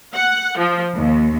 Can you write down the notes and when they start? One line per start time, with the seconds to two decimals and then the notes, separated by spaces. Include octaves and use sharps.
0.14 F#5
0.58 F3
0.95 D#2